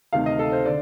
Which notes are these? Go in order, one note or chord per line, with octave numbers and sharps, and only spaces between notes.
D2 C3 D#3 F5
D#5
A4
C5
D3 D5